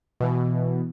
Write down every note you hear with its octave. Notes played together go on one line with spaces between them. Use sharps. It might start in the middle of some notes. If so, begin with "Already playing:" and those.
B2 E3